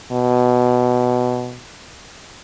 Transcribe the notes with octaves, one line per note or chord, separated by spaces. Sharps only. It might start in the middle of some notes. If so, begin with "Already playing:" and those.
B2